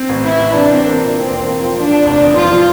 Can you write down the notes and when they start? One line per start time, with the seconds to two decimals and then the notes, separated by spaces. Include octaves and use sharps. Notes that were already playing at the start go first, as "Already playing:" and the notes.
Already playing: C4
0.09 A1
0.24 E3 E4
0.39 E3
0.54 C3 D4
0.70 C4
0.85 A#3
1.00 A#2
1.15 E3 C4
1.31 E1
1.45 A#3
1.61 F3
1.76 F3 D4
1.91 F3
2.06 F1
2.21 E2
2.36 F3 F4
2.52 F3